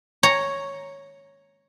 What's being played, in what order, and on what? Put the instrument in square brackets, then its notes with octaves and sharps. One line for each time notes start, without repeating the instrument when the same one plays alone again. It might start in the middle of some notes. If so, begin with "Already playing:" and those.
[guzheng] C#5 A#5